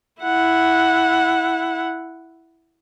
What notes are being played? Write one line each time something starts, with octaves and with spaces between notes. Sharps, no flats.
E4 F#5